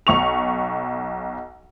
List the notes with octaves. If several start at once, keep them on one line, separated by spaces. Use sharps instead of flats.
B1 C#6 F7